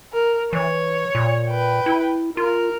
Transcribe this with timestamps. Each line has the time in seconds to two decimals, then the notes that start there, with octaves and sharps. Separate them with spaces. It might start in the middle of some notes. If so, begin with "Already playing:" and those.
0.13 A#4
0.53 E3 C#5
1.15 A#2
1.50 B4 G5
1.86 E4
2.37 F4 A#4